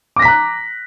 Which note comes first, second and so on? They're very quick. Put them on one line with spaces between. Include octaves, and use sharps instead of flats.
D6 A#6 B6 A#5 F#6